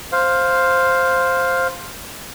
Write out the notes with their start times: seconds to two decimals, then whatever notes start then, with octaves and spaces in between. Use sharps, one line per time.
0.12 C5 F5